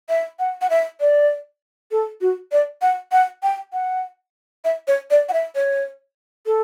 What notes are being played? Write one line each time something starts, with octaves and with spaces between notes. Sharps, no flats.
E5
F#5
F#5
E5
D5
A4
F#4
D5
F#5
F#5
G5
F#5
E5
C#5
D5
F#5
E5
C#5
A4